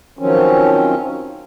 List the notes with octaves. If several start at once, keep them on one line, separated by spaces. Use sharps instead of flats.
D#3 F3 F#3 C4 C#4